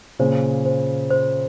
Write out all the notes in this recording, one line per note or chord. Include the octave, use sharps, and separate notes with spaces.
A#2 C#3 C5
C5
C5